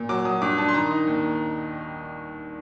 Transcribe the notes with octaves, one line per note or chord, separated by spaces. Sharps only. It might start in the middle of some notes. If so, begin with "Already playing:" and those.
Already playing: A#2
F#3 D6
F#3 D#6
G2 D6
D4 A5
C6
D#3 A#5
D#4
D#2